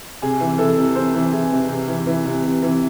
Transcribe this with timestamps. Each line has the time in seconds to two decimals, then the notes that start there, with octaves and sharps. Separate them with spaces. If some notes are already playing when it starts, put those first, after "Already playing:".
0.22 C3 G#4
0.40 E3
0.58 E3 A4
0.78 C3
0.95 C3 C5
1.14 E3
1.32 E3 G#4
1.52 C3
1.69 C3
1.88 E3
2.06 E3
2.25 C3
2.44 C3
2.62 E3